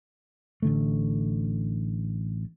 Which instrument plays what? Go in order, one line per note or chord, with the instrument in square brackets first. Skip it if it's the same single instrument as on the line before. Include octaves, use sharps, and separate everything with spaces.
[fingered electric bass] A1 D3 A3